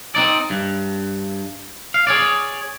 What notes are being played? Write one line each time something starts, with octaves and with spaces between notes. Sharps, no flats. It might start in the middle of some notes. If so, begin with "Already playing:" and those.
C4 D#4 D5
G2
F5
G#4 C#5 D5